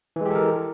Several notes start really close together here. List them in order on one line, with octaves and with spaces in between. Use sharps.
E3 G#3 G4 A4 A#4